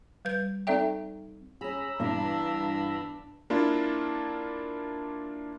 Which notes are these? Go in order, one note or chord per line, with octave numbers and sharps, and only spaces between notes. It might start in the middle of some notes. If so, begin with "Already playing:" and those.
G3 B4 G6
C4 D#4 A4 D5 E5 G5
C#4 G#4 A#5 B5 E6
G2 E3 B3 D4
A#3 D4 E4 F4